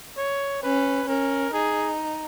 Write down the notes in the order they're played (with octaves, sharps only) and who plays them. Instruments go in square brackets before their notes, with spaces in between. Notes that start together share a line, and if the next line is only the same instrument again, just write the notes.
[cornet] C#5
[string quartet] C#4 [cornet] B4
[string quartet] C#4 [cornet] A#4
[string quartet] D#4 [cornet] G#4